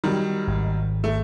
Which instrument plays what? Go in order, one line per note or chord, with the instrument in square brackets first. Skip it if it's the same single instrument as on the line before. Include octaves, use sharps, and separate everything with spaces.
[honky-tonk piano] D#3 F#3 G3
[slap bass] G#1
[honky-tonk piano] A3